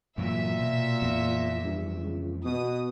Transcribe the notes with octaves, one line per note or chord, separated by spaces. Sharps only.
G2 A#2 E3 F#3 E5
B2
F2 E3 B3
G2
C#2
B2 D#6